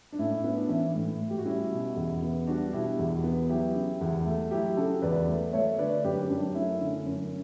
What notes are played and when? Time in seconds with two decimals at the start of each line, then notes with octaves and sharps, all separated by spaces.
0.12 D4
0.19 A2 C#4 E4
0.44 B3 C#4
0.57 D4
0.69 E3 C#4 E4
0.95 A2
1.20 A2
1.30 G4
1.38 F#4
1.45 G3 C#4 E4
1.72 B2
1.96 E2
2.23 B3
2.47 G3 D4 F#4
2.73 B2 E4 G4
2.99 E2
3.24 B3
3.49 F#3 E4 G4
3.75 C#3
4.01 E2
4.26 A3
4.51 F#3 E4 G4
4.77 C#3 F#4 A4
5.02 E2 B4 D5
5.28 A3
5.53 A3 C#5 E5
5.78 D3 B4 D5
6.04 F#2 G4 B4
6.17 C#4
6.29 F#2 D4
6.42 D4
6.55 A3 C#4 E4
6.81 D3 C#4
7.05 F#2 C#4